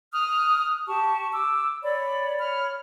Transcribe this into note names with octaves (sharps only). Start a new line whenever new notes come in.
D#6 F6 F#6
G4 A5 C#6
D6 E6
C#5 D5 B5
C#5 B5 F6